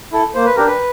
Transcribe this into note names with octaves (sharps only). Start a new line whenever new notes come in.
E4 A4
A#3 C5
B4
D4 G4 A#4
B4